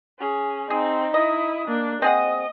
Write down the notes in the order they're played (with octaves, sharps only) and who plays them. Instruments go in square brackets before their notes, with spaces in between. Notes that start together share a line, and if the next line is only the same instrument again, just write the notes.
[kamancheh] C#4 G#4
[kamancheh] C4 [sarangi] D#4 [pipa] G#4
[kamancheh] E4 D#6 [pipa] D#5
[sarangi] A#3 [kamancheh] D4
[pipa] C4 G#4 F#5 [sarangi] D#5 [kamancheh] D#6